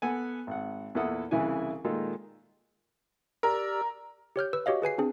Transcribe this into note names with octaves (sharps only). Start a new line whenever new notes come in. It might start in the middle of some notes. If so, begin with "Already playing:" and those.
B3 A4 F#5 G#5
G#1 F#5
E2 A#2 E4 A4 F#5 D#6
C2 C#3 E3 E4 G#5
A#2 D#3 G#3 D#4 F4 A4
G4 A#4 D5 E6
G4 C#5 F6 G6
B4 E6
F#4 G4 C#5 D#5 F5
G#4 B4 G#5 C7
C4 D4 G#4